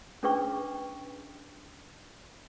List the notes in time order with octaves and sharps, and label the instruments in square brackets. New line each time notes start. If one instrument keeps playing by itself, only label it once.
[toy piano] C#4 D4 G#4 B4 G5 C#6